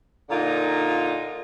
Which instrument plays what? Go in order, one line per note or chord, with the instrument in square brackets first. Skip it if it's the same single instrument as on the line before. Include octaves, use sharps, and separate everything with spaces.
[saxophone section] A#2 D3 A#3 D#4 F4